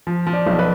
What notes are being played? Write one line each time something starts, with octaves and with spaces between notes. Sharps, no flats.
F3
F3
D5
B1
B4